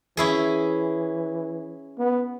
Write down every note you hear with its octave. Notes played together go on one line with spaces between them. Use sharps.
E3 C#4 E4 G#4
B3